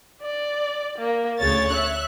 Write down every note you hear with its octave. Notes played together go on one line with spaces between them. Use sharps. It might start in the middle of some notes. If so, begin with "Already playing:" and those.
D5
A#3
D2 C#3 C#5 A6
E5 F#6